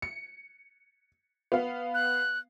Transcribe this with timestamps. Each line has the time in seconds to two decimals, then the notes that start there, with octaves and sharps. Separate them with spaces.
0.02 C#7
1.52 B3 F5
1.94 F#6